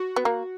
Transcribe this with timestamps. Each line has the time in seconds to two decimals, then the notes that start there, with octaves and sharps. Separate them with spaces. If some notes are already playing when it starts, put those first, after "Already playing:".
Already playing: F#4
0.16 B3
0.25 A#3